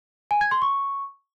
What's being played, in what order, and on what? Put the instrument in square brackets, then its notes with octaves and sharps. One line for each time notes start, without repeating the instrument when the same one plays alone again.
[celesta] G#5
G#6
C6
C#6